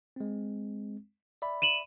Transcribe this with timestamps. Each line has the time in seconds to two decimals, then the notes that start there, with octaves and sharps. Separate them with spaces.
0.16 G#3 C4
1.42 D5 E5 B5
1.62 D#7 E7 F#7